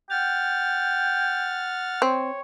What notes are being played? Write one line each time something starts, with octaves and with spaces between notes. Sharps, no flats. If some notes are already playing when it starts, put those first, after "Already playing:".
F#5 G5 F6 A6
C4 C#5